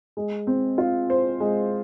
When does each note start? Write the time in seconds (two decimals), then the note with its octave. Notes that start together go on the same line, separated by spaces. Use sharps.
0.17 G#3
0.47 C4
0.78 F4
1.10 C5
1.40 G#3